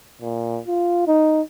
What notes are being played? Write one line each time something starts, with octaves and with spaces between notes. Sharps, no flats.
A#2
F4
D#4